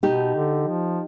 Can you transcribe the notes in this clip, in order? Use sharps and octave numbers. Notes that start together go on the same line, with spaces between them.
B2 D#4 G4
D3
F3